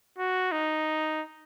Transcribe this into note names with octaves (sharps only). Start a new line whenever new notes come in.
F#4
D#4